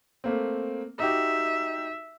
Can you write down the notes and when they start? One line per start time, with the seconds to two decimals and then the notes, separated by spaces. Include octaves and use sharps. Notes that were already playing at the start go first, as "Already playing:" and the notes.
0.24 A3 A#3 C4
1.00 D#4 F#4 G4 E5